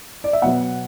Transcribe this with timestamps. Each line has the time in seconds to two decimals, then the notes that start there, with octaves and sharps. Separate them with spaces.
0.24 D5
0.33 E5
0.42 B2 F#3 B3 F#5